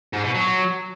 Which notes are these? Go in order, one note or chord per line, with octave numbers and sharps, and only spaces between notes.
G#2
B2
F#3